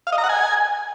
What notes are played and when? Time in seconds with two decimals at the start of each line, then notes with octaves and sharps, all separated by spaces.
0.07 F5
0.12 D#5
0.18 A#5
0.24 F#5
0.29 G#5